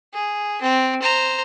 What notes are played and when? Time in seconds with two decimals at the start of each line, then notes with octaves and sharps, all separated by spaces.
0.13 G#4
0.61 C4
1.02 C5 A#5